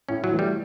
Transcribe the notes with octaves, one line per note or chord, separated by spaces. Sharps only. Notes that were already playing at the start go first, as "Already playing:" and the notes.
A2 C#4
F#3
E3 A3
G3